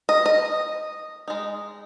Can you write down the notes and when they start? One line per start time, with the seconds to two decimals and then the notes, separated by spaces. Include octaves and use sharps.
0.09 D#5
0.26 D#5
1.28 G#3 D#4